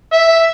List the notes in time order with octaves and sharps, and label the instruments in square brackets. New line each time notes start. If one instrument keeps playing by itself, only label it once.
[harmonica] E5